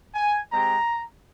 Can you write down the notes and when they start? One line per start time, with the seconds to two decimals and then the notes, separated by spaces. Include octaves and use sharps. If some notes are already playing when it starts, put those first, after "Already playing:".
0.15 G#5
0.51 G#3 C4 G4 A#5